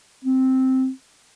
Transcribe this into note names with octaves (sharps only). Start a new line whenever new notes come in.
C4